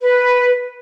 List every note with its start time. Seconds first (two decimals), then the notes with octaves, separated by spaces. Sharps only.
0.01 B4